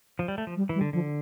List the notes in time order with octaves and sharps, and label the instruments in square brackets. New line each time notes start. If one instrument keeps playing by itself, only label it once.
[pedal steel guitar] F3
G3
A3
F3
[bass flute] G3
[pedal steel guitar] E3
[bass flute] G3
[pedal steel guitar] D3
[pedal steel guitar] D3 [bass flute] F3